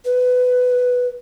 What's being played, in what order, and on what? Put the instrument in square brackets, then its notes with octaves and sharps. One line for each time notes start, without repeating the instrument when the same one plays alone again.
[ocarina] B4